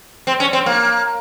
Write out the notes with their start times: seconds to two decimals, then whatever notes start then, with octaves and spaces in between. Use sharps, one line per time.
0.27 C4
0.40 C#4
0.53 C4
0.66 A#3